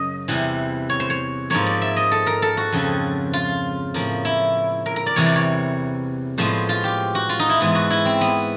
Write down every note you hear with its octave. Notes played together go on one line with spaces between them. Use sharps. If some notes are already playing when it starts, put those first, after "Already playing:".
Already playing: F#2 C#3 D#5
E2 C3 E3 G3
C#5
C5
C#5
G#2 F3 A#3 C#5
D5
E5
D#5
A4
A#4
A4
F#4
F2 C#3 F3
F4
A2 F3 A#3
E4
A#4
A#4
D5
E2 C3 E3 G3 C#5
D5
C#5
A2 F3 G#3 B3 C5
F4
G4
F#4
F4
D#4
E4
G#2 E3 G#3 B3
F#4
E4
C4
B3